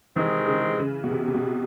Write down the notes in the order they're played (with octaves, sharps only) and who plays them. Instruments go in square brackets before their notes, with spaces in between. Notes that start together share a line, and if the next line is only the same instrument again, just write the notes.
[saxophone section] C3 D#3 G#3 C4 [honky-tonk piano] E3
[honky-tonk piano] C#3
C#3
B2
C3
C3
B2